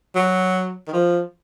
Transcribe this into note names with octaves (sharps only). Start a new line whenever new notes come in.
F#3
D#3
F3